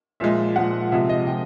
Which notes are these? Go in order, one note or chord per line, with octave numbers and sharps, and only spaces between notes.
A#2 F3 G#3 E5
A#2 F3 G#3 F#5
C3 F3 G#3 E5
D#5
C3 F3 G#3 G5